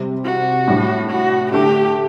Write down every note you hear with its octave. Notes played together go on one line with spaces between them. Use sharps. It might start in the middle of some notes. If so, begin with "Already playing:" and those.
Already playing: C3 G3 C4
F#4
A2 G3 D4
F#4
D3 A3 D4 G4